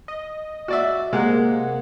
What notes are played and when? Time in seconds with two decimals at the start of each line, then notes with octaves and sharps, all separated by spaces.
0.08 D#5
0.68 F#4 D5 E5
1.13 C3 G#3 A#3 F#5